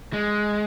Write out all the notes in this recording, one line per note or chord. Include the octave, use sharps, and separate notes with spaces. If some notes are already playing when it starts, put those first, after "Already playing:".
G#3